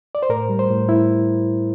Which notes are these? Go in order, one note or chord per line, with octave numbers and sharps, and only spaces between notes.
D5
C5
A2 A#4
G3
C5
A2
A2 E4